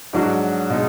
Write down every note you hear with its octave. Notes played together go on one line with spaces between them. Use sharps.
G#2 F#3 D4 F#4
B2 G#3 D#4